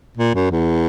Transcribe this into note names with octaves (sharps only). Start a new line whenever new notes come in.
A#2
F#2
E2